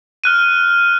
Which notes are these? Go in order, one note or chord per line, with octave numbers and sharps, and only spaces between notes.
F6 F#6 D#7